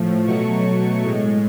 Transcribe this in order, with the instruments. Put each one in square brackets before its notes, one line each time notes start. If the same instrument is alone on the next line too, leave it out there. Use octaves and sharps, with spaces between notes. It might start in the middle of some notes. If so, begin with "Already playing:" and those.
Already playing: [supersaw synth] A2 F3 A3
B2 F#3 A3 C#6
A2 G#3